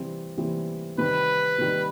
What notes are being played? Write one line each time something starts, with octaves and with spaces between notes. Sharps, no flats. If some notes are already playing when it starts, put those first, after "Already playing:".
Already playing: C3 E3 G3 C4
C3 E3 G3 C4
C3 D#3 G3 B4
C3 D#3 G3